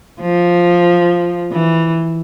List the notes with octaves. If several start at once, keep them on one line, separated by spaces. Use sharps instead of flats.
F3
E3